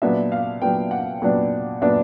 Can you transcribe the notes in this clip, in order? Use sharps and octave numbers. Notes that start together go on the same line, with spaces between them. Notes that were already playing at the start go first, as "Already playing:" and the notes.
A#2 F#3 B3 D4 E5
F5
A#2 F#3 B3 D4 G5
F#5
A#2 F#3 B3 D4
A#2 F#3 B3 D4 E5